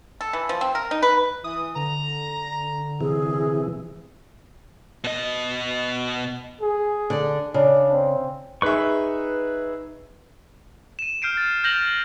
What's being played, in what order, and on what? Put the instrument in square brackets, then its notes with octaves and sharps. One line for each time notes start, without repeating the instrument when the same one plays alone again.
[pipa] A4
E3
F3
C4
A#4
D#4
B4
[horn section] E3 [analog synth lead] D#6
[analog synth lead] D3 [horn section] A#5
[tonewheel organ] C3 E3 [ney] G#4
[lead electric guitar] B2 D#5
[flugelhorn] G#4
[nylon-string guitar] D3 D5
[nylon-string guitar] C#3 [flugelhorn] D4
[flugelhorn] C4
[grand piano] D#4 G#4 E5 [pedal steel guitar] B4 C#6
[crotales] D#7 E7
F6 G6 C7 D7 D#7
A6
F6 G6 A#6 F7 F#7